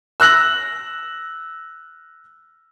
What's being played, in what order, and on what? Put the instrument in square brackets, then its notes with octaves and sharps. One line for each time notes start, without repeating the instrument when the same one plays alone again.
[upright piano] E6 F#6 A#6 F#7